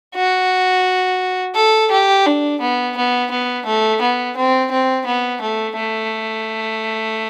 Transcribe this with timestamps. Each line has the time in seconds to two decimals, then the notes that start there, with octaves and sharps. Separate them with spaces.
0.16 F#4
1.55 A4
1.91 G4
2.26 D4
2.61 B3
2.97 B3
3.31 B3
3.66 A3
4.01 B3
4.37 C4
4.71 C4
5.06 B3
5.42 A3
5.77 A3